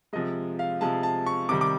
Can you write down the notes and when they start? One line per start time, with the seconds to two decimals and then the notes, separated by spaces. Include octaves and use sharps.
0.13 C3 F3 G#3 D#5
0.59 F5
0.81 C3 F3 G#3 A5
1.03 A5
1.27 C#6
1.49 C3 D#3 G3 D6
1.61 D6